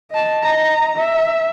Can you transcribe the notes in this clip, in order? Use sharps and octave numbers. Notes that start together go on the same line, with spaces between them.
D#5 A5
D#5 A#5
E5